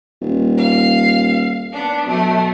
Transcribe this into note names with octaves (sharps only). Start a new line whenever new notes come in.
D#1
F5
B3 D4
B2 F#3 A3